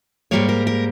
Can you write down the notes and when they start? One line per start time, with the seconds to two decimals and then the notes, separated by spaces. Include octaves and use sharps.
0.31 G#2 G3 A#3 C#5
0.49 A#4
0.67 A#4